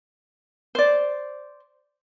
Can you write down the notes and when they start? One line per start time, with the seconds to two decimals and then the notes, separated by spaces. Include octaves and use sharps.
0.75 C5 D5